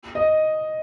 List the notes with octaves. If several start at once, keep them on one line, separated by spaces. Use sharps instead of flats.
D#5